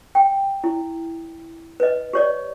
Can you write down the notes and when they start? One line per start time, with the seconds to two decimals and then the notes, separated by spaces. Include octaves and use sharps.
0.15 G5
0.64 E4
1.80 B4 D#5
2.13 G4 C#5 D5